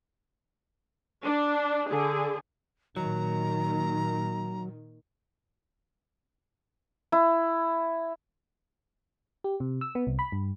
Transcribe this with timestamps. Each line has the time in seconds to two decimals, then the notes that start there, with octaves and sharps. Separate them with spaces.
1.23 D4
1.90 D3 G#4
2.97 A#2 D#3 F#3 A#5
7.12 E4
9.44 G4
9.60 C3
9.81 E6
9.95 B3
10.07 C2
10.19 B5
10.32 G2